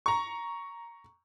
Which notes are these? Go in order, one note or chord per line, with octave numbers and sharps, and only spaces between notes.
A#5 C#6